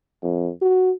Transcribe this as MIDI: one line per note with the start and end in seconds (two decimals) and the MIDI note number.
0.23 0.51 41
0.61 0.93 66